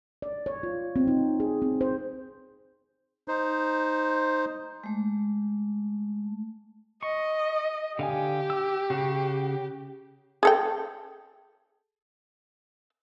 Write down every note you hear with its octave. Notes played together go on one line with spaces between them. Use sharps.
D5
C#5
F4
C4
D#4
G#4
C4
C5
D#4 C5
G#3 A3
D#5 C#6
D3 G4 F5 G#5
D6 E6
C#3 F#4
G#4 A4 G5